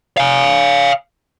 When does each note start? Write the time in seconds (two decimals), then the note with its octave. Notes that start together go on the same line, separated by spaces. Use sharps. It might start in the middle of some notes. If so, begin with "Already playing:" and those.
0.17 F5 G#5